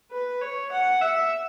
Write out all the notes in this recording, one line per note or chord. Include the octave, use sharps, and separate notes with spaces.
B4
C#5
F#5
E5